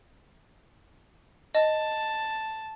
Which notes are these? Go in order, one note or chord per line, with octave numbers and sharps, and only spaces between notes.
D#5 A5